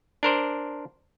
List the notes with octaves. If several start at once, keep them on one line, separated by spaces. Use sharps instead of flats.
D4 A#4 C5 D5